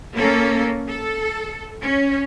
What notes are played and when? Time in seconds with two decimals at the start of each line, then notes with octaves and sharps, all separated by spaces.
0.13 A#3 C#4 A4
0.88 A4
1.81 C#4